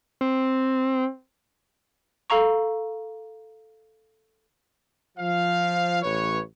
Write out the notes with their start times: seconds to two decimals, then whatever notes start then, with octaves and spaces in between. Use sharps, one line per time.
0.21 C4
2.30 A4 F5 A#5 C#6
5.18 F3 F5
6.01 A1 B4 C#5